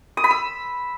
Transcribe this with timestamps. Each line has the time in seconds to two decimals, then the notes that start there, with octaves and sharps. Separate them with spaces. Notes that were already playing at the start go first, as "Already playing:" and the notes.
0.17 D#6
0.24 B5
0.31 E6